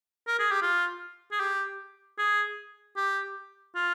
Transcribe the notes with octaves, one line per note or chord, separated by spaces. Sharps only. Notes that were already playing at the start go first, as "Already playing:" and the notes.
A#4
G#4
G4
F4
G#4
G4
G#4
G4
F4